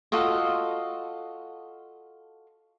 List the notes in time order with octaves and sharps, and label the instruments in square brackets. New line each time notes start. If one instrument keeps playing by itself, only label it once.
[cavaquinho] F4 F#4 A4 D#5